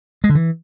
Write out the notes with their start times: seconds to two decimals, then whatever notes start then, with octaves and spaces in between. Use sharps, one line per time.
0.24 G#3
0.29 D3
0.35 E3